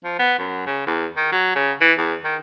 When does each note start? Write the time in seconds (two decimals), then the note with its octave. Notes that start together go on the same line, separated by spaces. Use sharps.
0.04 F3
0.19 B3
0.38 F#2
0.66 C#3
0.86 E2
1.17 D#3
1.32 F#3
1.56 C#3
1.81 E3
1.98 E2
2.25 D#3